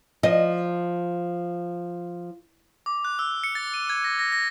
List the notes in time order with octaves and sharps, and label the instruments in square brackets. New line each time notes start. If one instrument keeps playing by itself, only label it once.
[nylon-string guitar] F3 [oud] D#5
[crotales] D6
F#6
E6
C#7
A6
D#7
G#6
A#6
A#6
A#6